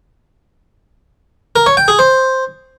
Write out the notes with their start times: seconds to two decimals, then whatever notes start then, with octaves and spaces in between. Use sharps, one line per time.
1.56 A#4
1.66 C#5
1.77 G5
1.88 G#4
1.99 C5